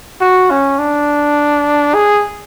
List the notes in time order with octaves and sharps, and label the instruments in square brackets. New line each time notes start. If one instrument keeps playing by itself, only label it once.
[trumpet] F#4
C#4
D4
G#4